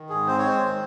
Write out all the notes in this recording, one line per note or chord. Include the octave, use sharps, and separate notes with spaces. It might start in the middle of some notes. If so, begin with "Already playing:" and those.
Already playing: D#3
G#2 G#4
C4 C5
C#5
G#3 C5
D#3